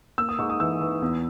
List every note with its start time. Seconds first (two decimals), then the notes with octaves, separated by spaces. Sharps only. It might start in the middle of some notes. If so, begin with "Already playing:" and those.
0.18 A#3 E6
0.29 D#6
0.39 G#2 C#6
0.50 D#6
0.60 E3 E6
0.81 E3
1.02 E2